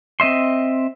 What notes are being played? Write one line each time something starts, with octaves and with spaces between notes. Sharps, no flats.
C4 D#5 E5 C6